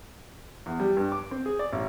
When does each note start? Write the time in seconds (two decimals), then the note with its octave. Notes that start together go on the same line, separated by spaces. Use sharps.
0.66 E2
0.80 G3
0.97 G2
1.12 D6
1.31 C4
1.46 G#4
1.59 D5
1.72 A1